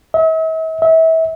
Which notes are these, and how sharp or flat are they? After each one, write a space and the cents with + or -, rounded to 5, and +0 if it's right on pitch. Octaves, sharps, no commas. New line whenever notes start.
E5 -45
E5 -30